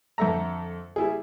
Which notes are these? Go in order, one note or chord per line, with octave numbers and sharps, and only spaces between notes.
F2 D3 A4 E5 A#5
G3 E4 G#4